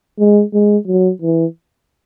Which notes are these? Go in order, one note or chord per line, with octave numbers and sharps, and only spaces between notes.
G#3
G#3
F#3
E3